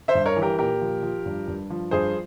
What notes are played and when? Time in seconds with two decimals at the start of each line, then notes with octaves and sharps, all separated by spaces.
0.08 C5 E5
0.15 G2
0.26 A#4 C#5
0.37 E3
0.42 G4 A#4
0.59 A#2 G4 A#4
0.82 F3
1.03 F3
1.26 G2
1.48 G2
1.70 F3
1.91 G2 G#4 C5